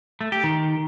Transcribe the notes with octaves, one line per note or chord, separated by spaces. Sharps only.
A3
G4
D#3